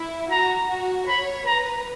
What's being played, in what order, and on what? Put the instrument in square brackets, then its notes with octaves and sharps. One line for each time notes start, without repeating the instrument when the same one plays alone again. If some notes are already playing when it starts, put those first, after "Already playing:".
Already playing: [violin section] E4
[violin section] F#4 [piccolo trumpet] A#5
[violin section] F#4
[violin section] C#5 [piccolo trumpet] B5
[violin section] B4 [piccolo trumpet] A#5